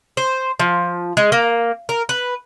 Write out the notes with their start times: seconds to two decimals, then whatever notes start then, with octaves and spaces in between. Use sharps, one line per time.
0.17 C5
0.60 F3
1.17 G#3
1.32 A#3
1.89 A#4
2.09 B4